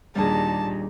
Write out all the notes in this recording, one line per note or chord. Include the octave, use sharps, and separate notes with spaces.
D#2 A#2 G3 D4 G#4 A5